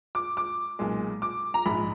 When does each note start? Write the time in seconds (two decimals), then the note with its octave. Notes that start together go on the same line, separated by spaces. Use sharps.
0.15 D6
0.37 D6
0.79 B1 A#2 G#3
1.22 D6
1.54 A#5
1.66 A#1 G#2 F3 G#3 B5